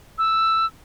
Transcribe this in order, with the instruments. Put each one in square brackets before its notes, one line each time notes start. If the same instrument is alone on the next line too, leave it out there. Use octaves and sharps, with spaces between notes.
[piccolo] E6